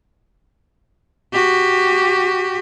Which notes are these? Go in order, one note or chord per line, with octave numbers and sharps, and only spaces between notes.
F#4 G4